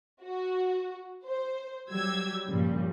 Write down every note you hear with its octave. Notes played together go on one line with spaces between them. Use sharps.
F#4
C5
F#3 G3 G4 E6 G#6
G2 A#2 C#3 F3 G3